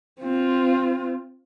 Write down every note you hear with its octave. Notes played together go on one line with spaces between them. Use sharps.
C4 F4